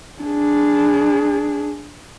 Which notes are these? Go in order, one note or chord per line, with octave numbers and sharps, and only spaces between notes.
D4 G#4